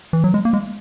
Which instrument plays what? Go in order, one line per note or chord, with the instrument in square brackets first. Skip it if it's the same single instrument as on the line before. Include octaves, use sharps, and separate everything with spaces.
[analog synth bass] E3
F#3
G#3
A#3
G#3